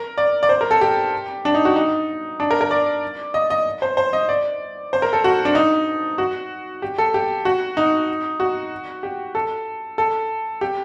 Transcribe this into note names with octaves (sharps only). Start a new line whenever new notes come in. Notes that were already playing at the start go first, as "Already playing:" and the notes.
Already playing: A#4
D5
D5
C5
A#4
A4
G4
D4
D#4
F#4
D#4
D4
A#4
A#4
D5
D#5
D#5
C5
C5
D#5
D5
C5
A#4
A4
F#4
D4
D#4
F#4
G4
A4
G4
F#4
D#4
F#4
G4
A4
A4
G4